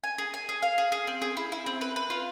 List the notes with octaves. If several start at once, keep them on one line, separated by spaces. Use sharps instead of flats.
G#5
G#4
G#5
G#4
F5
G#4
G#4
C4
G#4
E4
E4
C4
B4
B4
F4